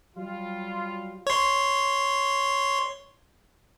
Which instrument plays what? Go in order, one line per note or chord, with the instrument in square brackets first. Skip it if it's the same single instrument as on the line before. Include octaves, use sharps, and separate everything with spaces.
[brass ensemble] F#3 G3 F4
[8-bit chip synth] C#5 C6